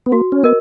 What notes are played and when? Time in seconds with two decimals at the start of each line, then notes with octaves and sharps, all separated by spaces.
0.06 B3
0.12 A#3 F#4
0.32 C#4
0.43 B3 A#4 D#5